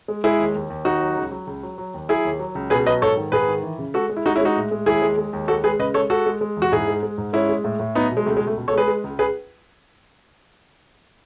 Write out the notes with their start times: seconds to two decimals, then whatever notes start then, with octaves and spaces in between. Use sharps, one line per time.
0.08 G#3
0.24 G#3 E4 G#4
0.39 D#2
0.55 D#2
0.70 D#2
0.85 D#2 D#4 F#4
1.01 F#3
1.17 C#2
1.32 F#3
1.47 C#2
1.63 F#3
1.78 F#3
1.94 D#2
2.09 F#3 E4 G#4
2.25 D#2
2.39 F#3
2.55 C#2
2.70 B2 G#4 B4
2.86 F#3 B4 D#5
3.02 G#2 A4 C#5
3.17 D#3
3.32 G#2 G#4 B4
3.47 D#3
3.63 E3
3.79 C#3
3.94 G#3 F#4 A4
4.10 G#3
4.17 E4
4.26 G#3 D#4 F#4
4.36 C#4 E4
4.41 G#3 D#4 F#4
4.56 A2
4.71 G#3
4.86 D#2 E4 G#4
5.02 G#3
5.18 G#3
5.33 D#2
5.48 G#3 F#4 A4
5.64 G#3 G#4 B4
5.79 C#3 B4 D#5
5.94 G#3 A4 C#5
6.10 G#3 F#4 A4
6.26 G#3
6.41 G#3
6.57 E2
6.62 F#4
6.72 G#2 E4 G#4
6.87 G#3
7.03 G#3
7.18 G#2
7.33 G#3 C#4 E4
7.49 G#3
7.64 A2
7.80 A2
7.95 F#3 B3 D#4
8.12 B2
8.17 G#3
8.26 C#2 A3
8.37 G#3
8.41 C#2
8.47 A3
8.57 B2
8.68 A4 C#5
8.73 G#3 G#4 B4
8.88 G#3
9.04 C#2
9.19 G#4 B4